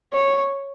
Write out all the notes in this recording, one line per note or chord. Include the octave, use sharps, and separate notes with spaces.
C#5